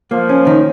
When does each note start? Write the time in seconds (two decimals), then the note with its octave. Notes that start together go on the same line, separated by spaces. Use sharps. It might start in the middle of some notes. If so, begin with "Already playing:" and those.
0.11 F3 A#3
0.29 C#4
0.47 D#3